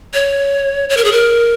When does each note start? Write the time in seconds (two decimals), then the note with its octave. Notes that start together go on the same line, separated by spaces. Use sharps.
0.14 C#5
0.89 C#5
0.97 A#4
1.04 G#4
1.12 A#4